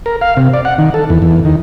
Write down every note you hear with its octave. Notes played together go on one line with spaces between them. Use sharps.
A#4
F5
C3
D5
F#5
D#3
A4
E2
E2
D#3